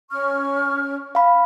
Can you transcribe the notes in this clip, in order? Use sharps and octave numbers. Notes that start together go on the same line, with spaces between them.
C#4 C#6 F6
F5 B5